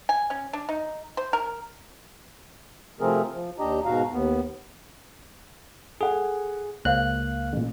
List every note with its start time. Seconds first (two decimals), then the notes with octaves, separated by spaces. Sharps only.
0.09 G#5
0.30 C#4
0.53 D4
0.69 D#4
1.17 C5
1.33 A#4
3.00 C3 F3 A3 C4 G#4 A#4
3.33 F3
3.59 D#2 D4 G4 D#5 A#5
3.85 G#2 B2 F#4 F5 A#5
4.12 D#2 B3
6.01 G#4 A4 F#5 G#5
6.85 C#2 A#3 C5 F5 F#6
7.53 A1 A#2